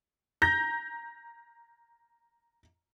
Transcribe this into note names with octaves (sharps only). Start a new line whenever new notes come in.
A#5 G6 A#6